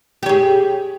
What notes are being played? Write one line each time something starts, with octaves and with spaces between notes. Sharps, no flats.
G4 G#4 C#5